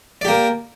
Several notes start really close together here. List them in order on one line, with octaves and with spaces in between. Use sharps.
D5 G4 A#3